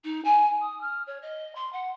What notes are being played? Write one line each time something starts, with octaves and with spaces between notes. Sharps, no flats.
D#4
G#5
D#6
F6
C#5
D#5
C6
F#5